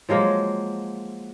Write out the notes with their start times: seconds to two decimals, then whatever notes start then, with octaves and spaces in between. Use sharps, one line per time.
0.09 F3 F#3 G#3 A#3